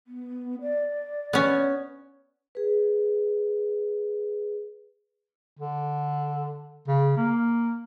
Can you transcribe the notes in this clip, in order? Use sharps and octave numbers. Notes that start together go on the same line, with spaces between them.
B3
D5
B3 C#4
G#4 B4
D3
C#3
A#3